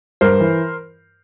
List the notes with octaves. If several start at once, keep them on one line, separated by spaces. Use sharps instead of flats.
G2 A#4 C5
E3